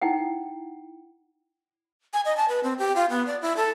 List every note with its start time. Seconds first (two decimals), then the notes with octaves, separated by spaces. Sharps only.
0.01 D#4 E4 F#5 G5
2.13 G#5
2.25 D#5
2.37 A5
2.48 B4
2.63 C4
2.79 G4
2.96 F4
3.10 B3
3.27 D5
3.42 E4
3.56 A4